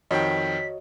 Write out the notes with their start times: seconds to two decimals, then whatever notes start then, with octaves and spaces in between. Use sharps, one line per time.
0.11 F2 D#3 F#4 C#5 D#5 G5 B6